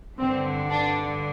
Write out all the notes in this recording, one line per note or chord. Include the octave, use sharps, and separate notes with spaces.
G2 D3 C4
D4